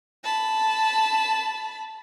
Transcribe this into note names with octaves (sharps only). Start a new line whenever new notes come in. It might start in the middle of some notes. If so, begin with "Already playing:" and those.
A5 B5